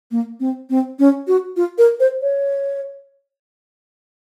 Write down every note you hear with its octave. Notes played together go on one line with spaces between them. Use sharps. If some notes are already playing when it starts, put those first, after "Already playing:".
A#3
C4
C4
C#4
F#4
F4
A#4
C5
C#5